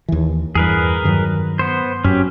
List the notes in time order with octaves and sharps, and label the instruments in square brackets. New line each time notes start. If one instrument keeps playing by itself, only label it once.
[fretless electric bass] D#2 E3
[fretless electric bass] E2 G2 [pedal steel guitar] G#4 A#4 B4
[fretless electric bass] G2 D#3 F#3
[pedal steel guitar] B3 C5
[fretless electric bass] F#2 [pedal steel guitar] C#4 G4